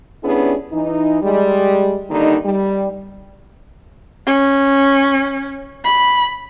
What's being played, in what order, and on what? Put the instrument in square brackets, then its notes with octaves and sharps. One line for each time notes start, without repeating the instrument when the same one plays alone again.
[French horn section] G3 B3 C#4 D4 E4 G#4
E3 D#4
G3 G#3
D3 D#3 G3 A#3 D#4
G3
[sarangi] C#4
B5